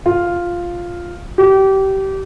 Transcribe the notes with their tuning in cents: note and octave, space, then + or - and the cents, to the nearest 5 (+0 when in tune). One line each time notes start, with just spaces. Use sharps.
F4 +0
G4 -25